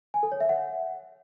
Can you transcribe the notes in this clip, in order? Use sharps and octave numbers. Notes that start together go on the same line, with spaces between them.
G#5
A4
C#5
E5
F#5